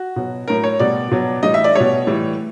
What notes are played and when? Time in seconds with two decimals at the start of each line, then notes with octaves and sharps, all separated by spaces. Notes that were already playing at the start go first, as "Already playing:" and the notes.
Already playing: F#4
0.16 B2 F#3
0.48 A2 F#3 A#4
0.64 C#5
0.79 B2 G3 D5
1.11 B2 F#3
1.43 A2 E3 G3 D#5
1.54 E5
1.64 D5
1.75 B2 G3 C#5
2.07 A2 E3 G3